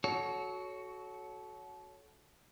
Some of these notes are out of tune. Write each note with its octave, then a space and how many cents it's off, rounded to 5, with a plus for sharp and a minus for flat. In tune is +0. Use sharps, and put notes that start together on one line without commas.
F#4 +0 A4 -25 C#5 +15